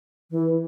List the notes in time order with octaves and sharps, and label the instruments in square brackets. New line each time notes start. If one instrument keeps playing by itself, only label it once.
[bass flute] E3